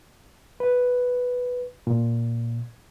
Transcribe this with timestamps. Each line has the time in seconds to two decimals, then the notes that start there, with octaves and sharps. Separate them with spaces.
0.60 B4
1.87 A#2